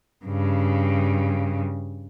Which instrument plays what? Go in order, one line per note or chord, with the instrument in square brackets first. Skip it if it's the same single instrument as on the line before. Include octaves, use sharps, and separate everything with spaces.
[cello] G2 C#3